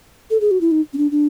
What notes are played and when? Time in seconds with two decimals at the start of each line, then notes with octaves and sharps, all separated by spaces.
0.30 A4
0.41 G#4
0.51 F#4
0.61 E4
0.71 D#4
0.93 C#4
0.98 D4
1.11 D4